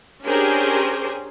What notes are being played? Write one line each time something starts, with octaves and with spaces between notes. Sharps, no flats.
C#4 D4 G4 G#4 A#4 C5